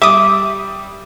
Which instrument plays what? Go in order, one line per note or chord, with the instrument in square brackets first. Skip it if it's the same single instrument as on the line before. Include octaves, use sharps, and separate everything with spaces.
[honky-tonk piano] G3 [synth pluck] E5 D#6 [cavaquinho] D6